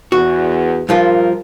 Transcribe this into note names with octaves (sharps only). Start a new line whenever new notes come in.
E2 F#4
G2 F3 F4 A#4